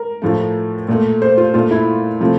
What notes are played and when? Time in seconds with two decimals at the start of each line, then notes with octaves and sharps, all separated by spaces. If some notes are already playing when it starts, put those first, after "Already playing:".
Already playing: A#4
0.22 A2 F3 A3
0.88 A#2 A3
1.22 C5
1.37 F4
1.54 A#2 A3 F4
1.71 E4
2.20 C3 F3 A3